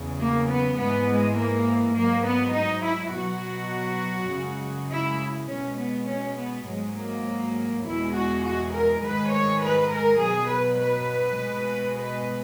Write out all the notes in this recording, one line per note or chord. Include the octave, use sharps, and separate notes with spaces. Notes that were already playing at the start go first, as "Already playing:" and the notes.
Already playing: E2 C#3 F#3
A#3
B3
G#2 E3 G#3 B3
G#3
A#3
G#2 F#3 A#3
B3
D#4
E4
B2 F#3 F#4
F#2 C#3 G#3
E4
B2 G#3 C#4
B3
C#4
B3
G#2 F#3 G#3
A#3
E2 B2 G#3 E4
F#4
F#4
A#4
G#2 D#3 G#3 B4
C#5
B4
A#4
B2 F#3 G#4
B4
B4
B2 G#3
B4